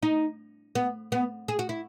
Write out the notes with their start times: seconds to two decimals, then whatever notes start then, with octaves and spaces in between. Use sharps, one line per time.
0.03 D#4
0.75 B3
1.12 B3
1.48 G#4
1.59 F#4
1.69 E4